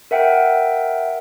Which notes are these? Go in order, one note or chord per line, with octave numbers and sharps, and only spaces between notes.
A#4 E5 F#5 G5